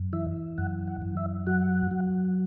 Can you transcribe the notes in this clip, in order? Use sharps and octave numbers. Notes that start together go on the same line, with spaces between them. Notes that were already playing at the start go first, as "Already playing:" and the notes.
Already playing: F#2
E3 E5
F#2 F#5
F#5
F#2
E5
F#3 F#5
F#3